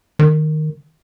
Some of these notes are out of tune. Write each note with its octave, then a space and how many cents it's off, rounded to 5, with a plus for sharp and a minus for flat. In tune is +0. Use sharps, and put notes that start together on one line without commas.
D#3 -10